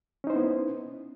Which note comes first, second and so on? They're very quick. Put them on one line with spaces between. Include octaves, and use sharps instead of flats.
C#4 D#4 C5 E4 B3